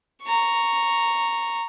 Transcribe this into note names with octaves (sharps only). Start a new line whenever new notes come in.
A#5 C#6